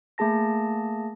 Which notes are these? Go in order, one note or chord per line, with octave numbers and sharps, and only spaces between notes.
A3 A#3 G#4 A5 A#6